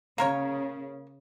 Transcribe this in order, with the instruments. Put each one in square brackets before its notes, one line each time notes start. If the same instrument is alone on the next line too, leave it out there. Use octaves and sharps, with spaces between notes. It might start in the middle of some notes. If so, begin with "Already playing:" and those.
[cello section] C#3 [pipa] A#3 A#4 C#5